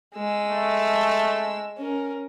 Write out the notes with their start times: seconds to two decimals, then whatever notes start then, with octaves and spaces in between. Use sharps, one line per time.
0.15 G#3 E6
0.50 A3
1.77 C#4 A#4